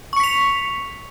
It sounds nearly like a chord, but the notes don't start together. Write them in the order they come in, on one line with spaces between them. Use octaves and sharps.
C#6 C#7 B6 F7